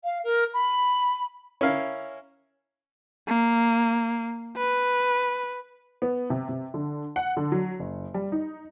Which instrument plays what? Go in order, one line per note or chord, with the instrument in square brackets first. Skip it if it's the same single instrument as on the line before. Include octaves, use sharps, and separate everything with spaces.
[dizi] F5
A#4
B5
[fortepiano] C#4 E4 A#4 F5
[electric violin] A#3
B4
[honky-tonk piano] B3
C3
C3
D3
F#5
D3
F#3
F#1
G3
D#4